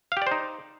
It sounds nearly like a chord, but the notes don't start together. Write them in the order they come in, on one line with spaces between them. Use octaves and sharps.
F5 G4 D5 C5 D#4